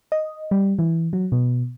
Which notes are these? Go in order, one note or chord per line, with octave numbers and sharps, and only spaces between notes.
D#5
G3
E3
F#3
B2